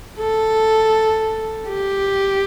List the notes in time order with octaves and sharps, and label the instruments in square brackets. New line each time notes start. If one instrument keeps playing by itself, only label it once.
[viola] A4
G4